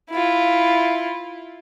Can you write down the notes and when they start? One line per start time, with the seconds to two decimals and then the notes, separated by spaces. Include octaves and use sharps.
0.10 E4 F4